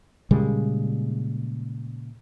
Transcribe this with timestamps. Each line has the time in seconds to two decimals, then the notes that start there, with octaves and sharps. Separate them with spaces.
0.31 A#2 C#3 G3 G#3